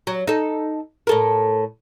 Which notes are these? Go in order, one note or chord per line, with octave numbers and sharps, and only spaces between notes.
F#3
D#4 A4
A2 A4 A#4